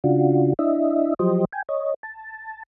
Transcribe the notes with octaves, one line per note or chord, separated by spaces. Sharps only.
C#3 D4 F4 F#4
D4 E4 D#5 E5
F3 F#3 G4 C5 D#5
G5 G#5
C#5 D#5
A5